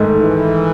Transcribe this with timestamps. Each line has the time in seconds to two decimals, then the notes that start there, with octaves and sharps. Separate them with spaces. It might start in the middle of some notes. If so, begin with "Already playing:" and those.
Already playing: G#2 D#3 A3
0.22 E3